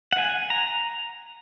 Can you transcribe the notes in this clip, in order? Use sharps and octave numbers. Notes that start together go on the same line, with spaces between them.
F#5
G#5
A#5